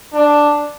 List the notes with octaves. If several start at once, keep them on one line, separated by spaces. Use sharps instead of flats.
D4